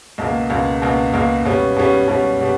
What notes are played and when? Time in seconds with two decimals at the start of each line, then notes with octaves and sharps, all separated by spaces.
0.18 C#2 B2 A#3
0.50 C#2 B2 A#3
0.82 C#2 B2 A#3
1.13 C#2 B2 A#3
1.45 B2 G3 C#4
1.76 B2 G3 C#4
2.08 B2 G3 C#4
2.40 B2 G3